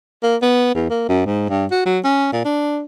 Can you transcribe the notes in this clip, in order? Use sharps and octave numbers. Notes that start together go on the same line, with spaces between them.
A#3
B3
E2
A#3
F#2
G#2
G2
F#4
F#3
C#4
A#2
D4